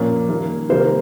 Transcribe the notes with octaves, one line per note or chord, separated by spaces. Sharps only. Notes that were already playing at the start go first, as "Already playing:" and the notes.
Already playing: A#2 F3 A#3 C#4
D#3 G3 A#3
C3 D#3 G3 A#3 C5